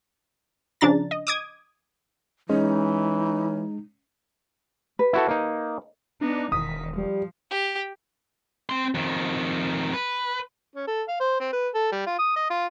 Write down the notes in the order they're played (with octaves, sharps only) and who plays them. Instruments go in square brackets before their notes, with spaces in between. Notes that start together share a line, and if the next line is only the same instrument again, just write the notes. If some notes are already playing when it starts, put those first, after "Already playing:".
[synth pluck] C#3 F3 D4 A#5 A6
D#5
D6 D#6 G#6
[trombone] E3 [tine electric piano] G#3 [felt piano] C#4 [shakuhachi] D#4
[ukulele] B4
[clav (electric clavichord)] E4 F#4 A4
A#3 D#4
[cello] B3 D#4 [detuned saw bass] D4
[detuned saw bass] E1 [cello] D#3 [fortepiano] D#6 [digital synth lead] B6
[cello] F3 [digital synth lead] G3
[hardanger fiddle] G4
[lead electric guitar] C4 C6
F2 D#3
B4
[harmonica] C#4
A4
F5
C5
C4
B4
A4
G3
F4
D#6
D#5
F4